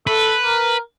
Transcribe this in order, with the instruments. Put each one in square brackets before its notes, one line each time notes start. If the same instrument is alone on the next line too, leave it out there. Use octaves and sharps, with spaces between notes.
[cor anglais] A4 [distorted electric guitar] B4
[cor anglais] A#4